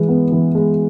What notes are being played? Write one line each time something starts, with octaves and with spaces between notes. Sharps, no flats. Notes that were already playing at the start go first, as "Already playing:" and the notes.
Already playing: E3 G#3
B3
E3
G#3